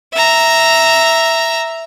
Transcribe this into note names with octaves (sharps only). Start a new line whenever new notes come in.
E5 A#5